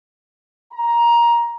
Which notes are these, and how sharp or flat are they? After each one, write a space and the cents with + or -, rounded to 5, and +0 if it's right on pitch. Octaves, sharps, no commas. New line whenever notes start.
A#5 +15